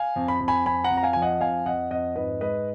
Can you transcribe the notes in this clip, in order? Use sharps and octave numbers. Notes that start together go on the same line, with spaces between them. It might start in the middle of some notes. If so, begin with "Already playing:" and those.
Already playing: F5 G#5
F2
B5
F2
G#5 B5
F2 G#5 B5
F#5 A#5
F2
A#5
F5 G#5
F3 G#5
D#5 F#5
F2 F5 G#5
F2 D#5 F#5
F2 D#5 F#5
G#2 B4 D#5
G#3 B4 D#5